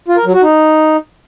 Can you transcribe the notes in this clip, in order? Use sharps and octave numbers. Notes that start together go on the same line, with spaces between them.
F4
A#4
F#3
F#4
D#4